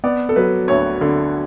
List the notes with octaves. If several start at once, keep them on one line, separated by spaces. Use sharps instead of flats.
B3 D5
A4
F#3 B4
D2 C#5
D3